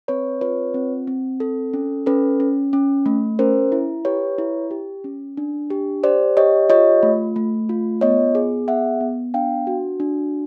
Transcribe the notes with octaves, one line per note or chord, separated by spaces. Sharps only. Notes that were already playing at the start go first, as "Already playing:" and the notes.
C4 B4 C#5
F4 B4 C#5
C4
C4
A4
C#4
C#4 A4 B4
C#4
C#4
A3
C#4 A#4 C5
E4
G4 B4 C#5
E4
G4
C#4
D4
G4
G4 C5 D5
G4 C#5 D#5
F4 C#5 D#5
A3
A3
F4
B3 C#5 D#5
G#4
B3 E5 F#5
B3
D4 F5 G5
F#4
D4